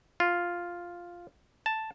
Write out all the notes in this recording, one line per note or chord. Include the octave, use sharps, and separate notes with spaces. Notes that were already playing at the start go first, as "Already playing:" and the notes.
F4
A5